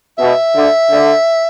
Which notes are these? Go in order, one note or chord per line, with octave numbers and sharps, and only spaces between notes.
B2 E5
D3
D3